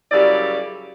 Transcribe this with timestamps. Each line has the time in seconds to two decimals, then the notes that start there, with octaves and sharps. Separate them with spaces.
0.11 F#2 C#3 G3 E4 D5